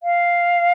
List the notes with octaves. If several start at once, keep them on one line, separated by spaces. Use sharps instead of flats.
F5